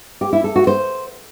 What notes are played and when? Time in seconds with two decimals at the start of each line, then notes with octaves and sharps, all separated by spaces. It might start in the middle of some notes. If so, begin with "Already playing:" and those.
0.21 G4
0.33 E4
0.44 A4
0.56 F#4
0.67 C5